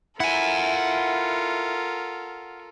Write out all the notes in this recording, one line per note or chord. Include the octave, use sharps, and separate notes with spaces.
E4 F4 A4 A#4 F#5 G#5